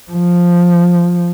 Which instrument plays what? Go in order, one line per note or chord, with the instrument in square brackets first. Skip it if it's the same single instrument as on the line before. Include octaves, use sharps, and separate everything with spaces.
[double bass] F3